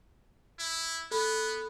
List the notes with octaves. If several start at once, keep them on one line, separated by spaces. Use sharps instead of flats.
E4
B3 A4 B5